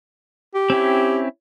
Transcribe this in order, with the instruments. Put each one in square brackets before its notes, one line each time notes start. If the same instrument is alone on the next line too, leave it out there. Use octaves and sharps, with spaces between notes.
[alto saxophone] G4
[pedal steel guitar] C4 C#4 E4